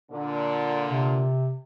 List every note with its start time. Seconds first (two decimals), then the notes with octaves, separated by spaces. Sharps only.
0.12 A#2 D3
0.89 C3